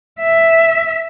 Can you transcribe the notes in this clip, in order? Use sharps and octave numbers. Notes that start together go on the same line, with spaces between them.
E5